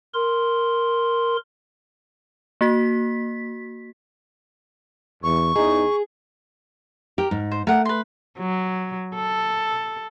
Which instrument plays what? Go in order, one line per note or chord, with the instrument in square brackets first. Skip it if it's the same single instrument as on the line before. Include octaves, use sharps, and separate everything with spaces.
[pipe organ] A#4 C6
[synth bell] A#3 F#4 B6
[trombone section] E2 [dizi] C#6
[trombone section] E2 D#4 [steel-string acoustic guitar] G#4
[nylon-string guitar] G4 [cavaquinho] A#4
[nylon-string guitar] G#2
[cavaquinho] C5
[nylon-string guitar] A3 [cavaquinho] A#4 F#5
[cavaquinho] B4 C6
[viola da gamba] F#3
A4